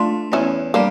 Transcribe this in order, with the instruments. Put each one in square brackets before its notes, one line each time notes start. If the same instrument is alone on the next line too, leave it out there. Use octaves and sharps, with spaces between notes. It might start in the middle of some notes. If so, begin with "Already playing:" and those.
Already playing: [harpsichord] A3 [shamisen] D4 F4
[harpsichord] E2 [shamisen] C#4 E4
[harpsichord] G3 [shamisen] A#3 D4